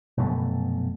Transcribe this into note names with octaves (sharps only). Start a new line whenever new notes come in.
F1 F#2 B2 A3